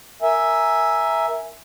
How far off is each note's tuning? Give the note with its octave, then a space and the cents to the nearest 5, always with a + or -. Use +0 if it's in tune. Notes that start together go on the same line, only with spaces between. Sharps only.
A#4 +0 E5 +0 G#5 +0